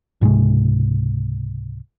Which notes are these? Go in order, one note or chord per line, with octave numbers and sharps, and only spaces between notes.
C#2 G#2 C3 G#3